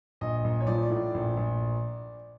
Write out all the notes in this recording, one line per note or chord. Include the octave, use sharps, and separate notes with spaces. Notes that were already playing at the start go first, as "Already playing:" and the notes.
A#1 D#5
A#1
C#5
F3 D5
A2
A#1
A#1